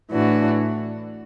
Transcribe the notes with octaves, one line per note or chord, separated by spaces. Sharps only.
A2 E3 D4 F#4